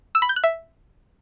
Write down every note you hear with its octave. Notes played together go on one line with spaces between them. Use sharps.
E6
B5
G6
F#6
E5